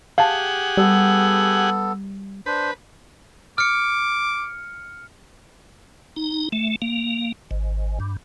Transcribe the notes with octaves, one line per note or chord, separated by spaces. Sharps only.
G4 G#4 F5 F#5 A5
G3 B3 A4
D4 B4 C5
D6 F6 C#7
D#4
A3
A#3
G#1
G2